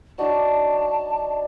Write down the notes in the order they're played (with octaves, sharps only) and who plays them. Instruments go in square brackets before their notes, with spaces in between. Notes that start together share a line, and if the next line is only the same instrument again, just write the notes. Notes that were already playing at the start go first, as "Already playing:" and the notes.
[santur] F#3 D4 D#4 [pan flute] A5